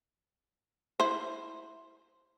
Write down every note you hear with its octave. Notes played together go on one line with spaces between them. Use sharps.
E4 C5